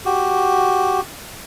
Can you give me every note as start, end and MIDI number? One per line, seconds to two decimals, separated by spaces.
0.05 1.01 66
0.05 1.01 67